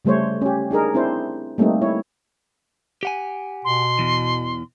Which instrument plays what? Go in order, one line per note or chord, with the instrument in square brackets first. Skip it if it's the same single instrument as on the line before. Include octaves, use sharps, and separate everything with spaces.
[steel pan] C#3 G3 A3 C5 C#5
C#4 G4
D4 D#4 G#4 A#4
C4 D4 E4 C5
G3 A3 A#3 C4 D#4
E4 C#5
[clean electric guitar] G4 F#5 G#5
[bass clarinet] B2 [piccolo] C6
[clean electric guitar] E2 E3